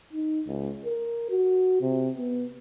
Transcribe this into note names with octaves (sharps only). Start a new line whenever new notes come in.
D#4
C#2
A#4
F#4
C3
B3